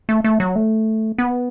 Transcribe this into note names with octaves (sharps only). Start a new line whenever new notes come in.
A3
A3
F#3
A3
B3